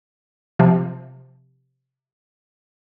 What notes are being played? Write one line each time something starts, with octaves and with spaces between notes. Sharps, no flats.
C3 F3